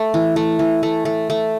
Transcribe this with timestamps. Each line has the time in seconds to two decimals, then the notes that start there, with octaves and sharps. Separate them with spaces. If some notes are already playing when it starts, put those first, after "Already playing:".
Already playing: A3
0.14 E3
0.36 A3
0.59 E3
0.83 A3
1.05 A3
1.30 A3